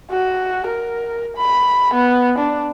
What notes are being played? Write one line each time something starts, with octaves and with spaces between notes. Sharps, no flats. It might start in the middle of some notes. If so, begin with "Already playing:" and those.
F#4
A#4
B5
B3
D4